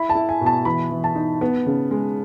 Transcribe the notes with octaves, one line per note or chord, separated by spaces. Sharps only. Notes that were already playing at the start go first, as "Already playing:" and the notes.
Already playing: E4 B5
A5
E4
G#5
B2
A5
E3 B5
E3
A5
D#4
B3
C#3
G#3